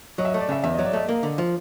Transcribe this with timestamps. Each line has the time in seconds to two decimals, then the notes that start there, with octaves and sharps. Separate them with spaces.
0.18 F#3 D#5
0.25 E5
0.30 D#5
0.34 A3
0.40 D5
0.49 C#3 E5
0.64 E2 E5
0.74 F#3 D#5
0.85 D5
0.93 A3 D#5
1.09 A#3
1.23 D3
1.38 F3